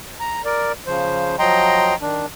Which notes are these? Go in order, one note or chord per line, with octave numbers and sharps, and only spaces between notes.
A#5
A#4 D5
C#3 F3 C5
F3 F#3 D#5 G5 A#5 C6
D#3 D4